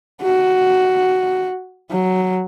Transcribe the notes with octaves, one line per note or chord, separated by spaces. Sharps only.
F#4
F#3